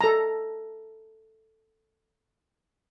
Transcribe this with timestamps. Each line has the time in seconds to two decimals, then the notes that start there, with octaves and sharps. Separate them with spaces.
0.01 A4 A#5